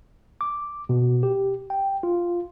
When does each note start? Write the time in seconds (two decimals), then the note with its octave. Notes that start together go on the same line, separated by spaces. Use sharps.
0.41 D6
0.89 B2
1.23 G4
1.70 G5
2.03 F4